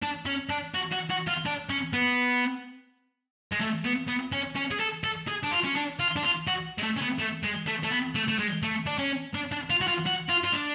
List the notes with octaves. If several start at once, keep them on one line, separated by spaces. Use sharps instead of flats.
D4
C#4
D4
F#4
F#4
F#4
F4
D4
C#4
B3
G#3
A3
B3
B3
C#4
C#4
G#4
A4
A4
G#4
D4
F4
C#4
D4
F4
D4
F4
F#4
G#3
A3
C#4
B3
A3
G#3
A3
A3
B3
A3
A3
G#3
A3
D4
C#4
D4
D4
F4
F#4
F4
F#4
F4
F4
D4